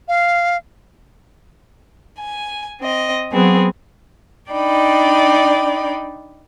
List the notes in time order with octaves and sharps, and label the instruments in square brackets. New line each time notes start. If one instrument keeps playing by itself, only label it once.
[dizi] F5
[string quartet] G#5
C4 D#5
F#3 B3 C4 G#4
D4 D#4 D5 G5 B5